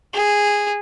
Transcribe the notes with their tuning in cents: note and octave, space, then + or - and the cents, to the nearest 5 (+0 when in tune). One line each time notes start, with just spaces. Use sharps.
G#4 -10